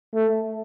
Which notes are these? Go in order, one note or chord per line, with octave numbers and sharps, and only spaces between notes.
A3